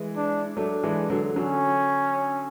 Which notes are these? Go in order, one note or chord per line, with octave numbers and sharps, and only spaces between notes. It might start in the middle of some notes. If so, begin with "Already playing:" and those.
Already playing: E3 G#3
D4
F#3 A3 D4
E3 G#3
D3 F#3
D3 F#3 C#4